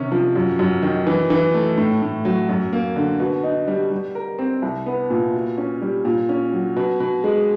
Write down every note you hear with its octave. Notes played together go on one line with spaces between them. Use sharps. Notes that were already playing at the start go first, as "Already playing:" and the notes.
Already playing: C3 D#3 C#4
F3
F#2
F#2
D#3
E3
E3
A3
A2
A2
F#3
F#2
A#3
D3
B2
D#4
G3
G3
A#4
C4
C2
B3
A#2
B2
C#4
G3
A#2
C#4
F#3
B2
B2
G#3